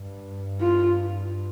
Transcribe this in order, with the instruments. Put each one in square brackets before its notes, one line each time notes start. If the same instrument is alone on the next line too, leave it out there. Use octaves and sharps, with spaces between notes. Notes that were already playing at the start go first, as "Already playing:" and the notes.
Already playing: [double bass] G2
[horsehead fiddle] F4